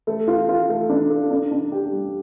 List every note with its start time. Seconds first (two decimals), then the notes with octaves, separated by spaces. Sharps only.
0.07 A3
0.28 F4
0.49 F4
0.69 A3
0.90 D4
1.10 A4
1.31 D4
1.51 D4
1.72 G4
1.92 G3